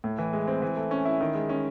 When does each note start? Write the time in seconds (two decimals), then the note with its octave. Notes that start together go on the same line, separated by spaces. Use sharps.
0.04 A2
0.18 E3
0.33 G#3
0.48 C4
0.62 E3
0.77 A3
0.91 C#4
1.05 E4
1.21 D#3
1.35 G#3
1.49 C#4